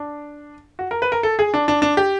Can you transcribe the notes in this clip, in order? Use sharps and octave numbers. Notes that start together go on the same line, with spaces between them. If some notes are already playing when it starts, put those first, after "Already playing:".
Already playing: D4
F#4
A#4
B4
A#4
A4
G#4
D4
D4
D4
G4